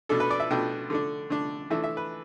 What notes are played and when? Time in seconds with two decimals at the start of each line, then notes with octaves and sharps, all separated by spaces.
0.09 B2 A3 D4 A4
0.20 B4
0.31 D5
0.40 E5
0.50 B2 A3 D4 G5
0.90 D3 A3 D4
1.30 D3 A3 D4
1.70 E3 A3 D4 E5
1.84 E5
1.97 B4